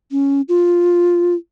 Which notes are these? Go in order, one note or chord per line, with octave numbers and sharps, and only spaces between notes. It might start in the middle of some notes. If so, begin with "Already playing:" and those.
C#4
F4